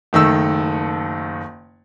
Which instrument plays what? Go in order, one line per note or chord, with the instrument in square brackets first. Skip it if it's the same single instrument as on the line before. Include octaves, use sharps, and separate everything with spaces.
[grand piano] F#1 D#3 A3 E6